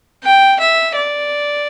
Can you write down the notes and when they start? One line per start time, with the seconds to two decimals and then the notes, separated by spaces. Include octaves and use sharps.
0.24 G5
0.60 E5
0.95 D5